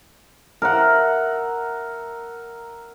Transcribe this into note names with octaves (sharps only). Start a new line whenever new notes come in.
A#4 E5 F#5